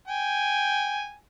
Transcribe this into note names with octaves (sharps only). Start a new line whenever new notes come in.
G5 G#5